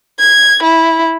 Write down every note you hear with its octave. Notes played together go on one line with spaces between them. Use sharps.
G#6
E4